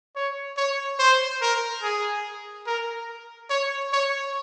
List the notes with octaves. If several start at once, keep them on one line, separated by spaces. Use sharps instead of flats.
C#5
C#5
C5
A#4
G#4
A#4
C#5
C#5